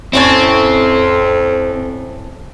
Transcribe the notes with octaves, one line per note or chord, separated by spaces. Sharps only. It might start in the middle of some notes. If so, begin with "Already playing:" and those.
F2 A2 C4 C#4 E4